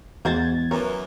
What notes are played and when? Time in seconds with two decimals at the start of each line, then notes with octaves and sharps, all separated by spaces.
0.25 E2 G#3 F#4 C5 G#6 A6
0.71 F#2 E3 A#4 C#5